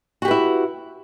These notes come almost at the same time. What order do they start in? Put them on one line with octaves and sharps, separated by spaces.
F#4 G4 B4 E4